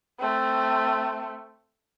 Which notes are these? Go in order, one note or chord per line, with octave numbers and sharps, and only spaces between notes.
A3 C4